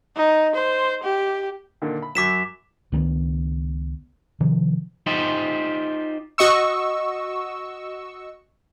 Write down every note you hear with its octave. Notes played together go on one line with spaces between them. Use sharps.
D#4
C5
G4
A#2 D3 D#3
B5
F#2 F#3 D6 B6 E7
C#2 D#3 A3 B3
C3 D#3 F3
D#4 F4 G4 C5
F#4 D#5 C#6 E6